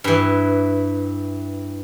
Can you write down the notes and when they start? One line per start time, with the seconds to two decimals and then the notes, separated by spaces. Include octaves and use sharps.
0.04 G2 E3